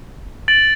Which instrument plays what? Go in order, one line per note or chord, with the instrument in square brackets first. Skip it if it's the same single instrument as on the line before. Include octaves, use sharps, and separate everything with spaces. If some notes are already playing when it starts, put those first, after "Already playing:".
[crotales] A6 D7 F#7